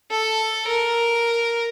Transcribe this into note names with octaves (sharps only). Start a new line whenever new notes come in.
A4
A#4